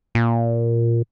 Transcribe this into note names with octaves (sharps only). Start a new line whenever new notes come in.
A#2